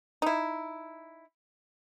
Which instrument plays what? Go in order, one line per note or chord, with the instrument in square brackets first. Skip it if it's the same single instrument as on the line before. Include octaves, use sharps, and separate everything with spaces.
[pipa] D#4 E4